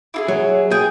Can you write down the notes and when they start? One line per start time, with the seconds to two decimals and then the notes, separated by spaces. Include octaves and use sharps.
0.14 E4 F4 G#4
0.28 F#3
0.71 G#4 G5